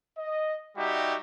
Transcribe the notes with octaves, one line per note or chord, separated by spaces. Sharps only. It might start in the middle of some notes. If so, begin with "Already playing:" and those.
D#5
G3 D#4 F#4 G4 E5